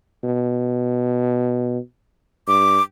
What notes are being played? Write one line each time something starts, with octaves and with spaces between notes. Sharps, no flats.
B2
G2 D6